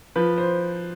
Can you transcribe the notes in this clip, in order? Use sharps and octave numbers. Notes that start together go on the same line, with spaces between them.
F3 B4
C5